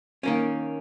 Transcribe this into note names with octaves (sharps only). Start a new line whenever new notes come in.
D#3 A#3 C#4